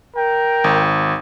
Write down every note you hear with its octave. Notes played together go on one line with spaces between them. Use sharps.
A#4 G5
G#1